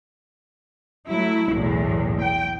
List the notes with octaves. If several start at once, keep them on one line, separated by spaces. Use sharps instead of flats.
F#3 A3 E4
B1 E2 A2
G5